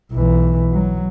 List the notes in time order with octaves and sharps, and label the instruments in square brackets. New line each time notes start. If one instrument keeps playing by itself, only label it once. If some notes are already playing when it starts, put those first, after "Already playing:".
[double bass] B1 E3
F#3